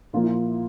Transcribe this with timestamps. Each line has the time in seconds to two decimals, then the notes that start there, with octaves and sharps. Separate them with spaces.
0.13 A#2 F3 A#3 F4
0.23 E4
0.32 F4